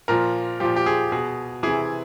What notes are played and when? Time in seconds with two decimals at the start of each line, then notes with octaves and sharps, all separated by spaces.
0.08 A#2 F3 A#4
0.60 A#2 F3 G4
0.76 G4
0.86 G#4
1.12 B2 G#4
1.63 C3 E3 G#4